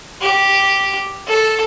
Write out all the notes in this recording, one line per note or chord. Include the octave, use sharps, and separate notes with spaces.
G4
A4